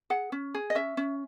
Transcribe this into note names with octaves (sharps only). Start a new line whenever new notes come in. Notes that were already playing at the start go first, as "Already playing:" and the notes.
G#4 F#5
C#4
G#4
D#5
C#4 E5
C#4